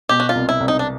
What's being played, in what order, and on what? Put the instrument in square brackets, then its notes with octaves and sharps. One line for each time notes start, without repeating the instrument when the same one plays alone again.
[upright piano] B2 [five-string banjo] G4
[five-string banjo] F#4
F4
[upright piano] C2
[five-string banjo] E4
[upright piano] C2
[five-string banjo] D#4
D4